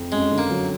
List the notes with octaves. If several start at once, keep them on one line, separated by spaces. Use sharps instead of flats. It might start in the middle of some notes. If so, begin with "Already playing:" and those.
Already playing: F2
F#2 G#3
D3
A#3
F#3